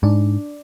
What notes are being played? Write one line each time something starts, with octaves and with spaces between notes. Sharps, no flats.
G#2 D4